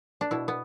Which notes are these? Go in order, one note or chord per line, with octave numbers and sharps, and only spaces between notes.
D4
B2 E4
B3